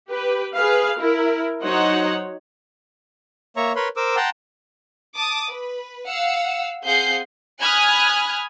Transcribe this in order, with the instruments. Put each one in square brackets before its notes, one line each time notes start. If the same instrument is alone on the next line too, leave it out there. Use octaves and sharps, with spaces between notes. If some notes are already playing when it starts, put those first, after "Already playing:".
[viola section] G4 B4
G#4 B4 F5
E4 A#4
F#3 D#4 C5 C#5 D#5 F#5
[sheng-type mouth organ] A#3 C#5 E5 A#5 C#6
A#4 B4 C#5 B5 C6
A#4 C5 D6 E6
F#5 G5 A5 A#5 C6
[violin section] A5 D6 D#6
B4
F5 F#5 E6
C4 G#4 F5 F#5 G6 C7
G#5 B5 D#6 F6 F#6 G#6